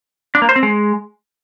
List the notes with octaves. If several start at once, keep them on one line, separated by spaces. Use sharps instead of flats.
D4
A#3
C5
C4
G#3